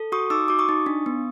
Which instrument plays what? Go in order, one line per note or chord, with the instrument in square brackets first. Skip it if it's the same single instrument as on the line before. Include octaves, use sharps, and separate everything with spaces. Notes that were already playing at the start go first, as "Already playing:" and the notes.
Already playing: [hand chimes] A4
F#4 C#6 D#6
D#4 D6 E6
F#4 D6
C#6 D#6
D#4
D4
B3